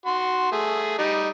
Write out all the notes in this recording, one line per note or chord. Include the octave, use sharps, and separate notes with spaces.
F#4 C6
A3 G#4
G3 D#4